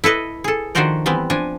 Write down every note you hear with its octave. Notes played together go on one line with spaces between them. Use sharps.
E4 A4 B4 D#5
G#4 A4
D#3 F3 D4 F#4 C5 D5
E3 G3 B3 C4
F3 D4 G#5